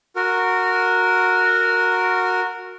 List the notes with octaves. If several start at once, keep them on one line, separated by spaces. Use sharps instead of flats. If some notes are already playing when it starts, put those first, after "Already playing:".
F#4 A#4